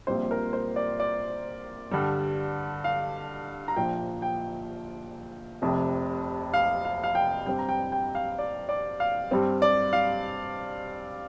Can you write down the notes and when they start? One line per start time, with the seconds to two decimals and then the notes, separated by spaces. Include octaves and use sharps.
0.07 A#1 A#2 G3 C4 C5
0.31 A#4
0.53 C5
0.76 D5
1.00 D5
1.91 G2 D3 G3
2.84 F5
3.68 A#5
3.76 A#1 A#2 F3 G5
4.22 G5
5.62 F1 F2 C3
6.54 F5
6.85 F5
7.04 F5
7.15 G5
7.46 G2 G3 C4 G5
7.59 A#5
7.69 G5
7.92 G5
8.15 F5
8.39 D5
8.69 D5
9.00 F5
9.31 G2 G3 C4
9.62 D5
9.93 F5